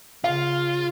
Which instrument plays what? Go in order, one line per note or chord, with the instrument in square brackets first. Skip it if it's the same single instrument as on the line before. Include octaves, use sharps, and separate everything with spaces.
[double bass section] C#3 [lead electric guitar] F4 [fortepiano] F5